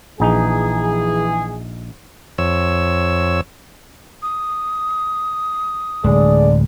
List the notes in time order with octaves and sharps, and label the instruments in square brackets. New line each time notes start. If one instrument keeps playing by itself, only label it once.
[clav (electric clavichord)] A#1 D#4 [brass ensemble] E3 G#4
[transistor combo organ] F2 C#5 E6
[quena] D#6
[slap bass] D1 G#3 [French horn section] D3 G#4 D5